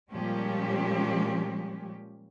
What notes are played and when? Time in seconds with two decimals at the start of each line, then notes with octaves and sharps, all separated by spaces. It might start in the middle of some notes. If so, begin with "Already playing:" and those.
0.11 A#2 F3 G3 G#3 C#4 G4